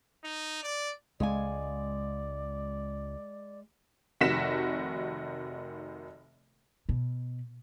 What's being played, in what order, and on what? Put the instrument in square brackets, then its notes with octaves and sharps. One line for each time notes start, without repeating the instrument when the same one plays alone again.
[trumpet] D#4
D5
[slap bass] C#2 [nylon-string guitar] G#3 F5 G#5 [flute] D5
[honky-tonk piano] F1 C3 D#3 F#4 B6 E7
[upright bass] B2